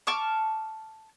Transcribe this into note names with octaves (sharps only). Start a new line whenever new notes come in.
A5 C#6 D6 F6